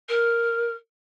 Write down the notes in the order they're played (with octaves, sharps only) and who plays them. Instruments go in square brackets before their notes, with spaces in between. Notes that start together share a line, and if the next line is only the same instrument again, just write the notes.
[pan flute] A#4